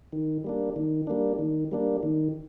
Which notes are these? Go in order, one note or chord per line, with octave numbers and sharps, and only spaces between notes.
D#3
G3 A#3 D4
D#3
G3 A#3 D4
D#3
G3 A#3 D4
D#3